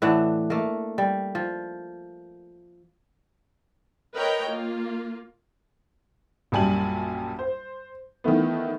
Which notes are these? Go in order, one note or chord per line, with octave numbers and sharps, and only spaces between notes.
A2 E3 D4 F#5
A3 A#3
G3
F3
A#4 B4 C#5 D#5 G5 A#5
A#3 F4
A#1 F#2 G3 G#5 A5 F#7
C5
D#3 E3 A3 B3